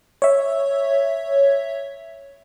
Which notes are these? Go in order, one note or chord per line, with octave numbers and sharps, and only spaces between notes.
C#5 E5